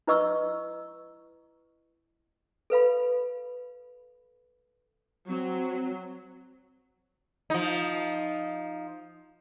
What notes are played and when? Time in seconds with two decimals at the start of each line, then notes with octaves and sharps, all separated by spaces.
0.07 E4 B4 D#5 C#6 E6
2.70 A4 B4 F5 B5
5.28 F#3 C4
7.50 F3 D#4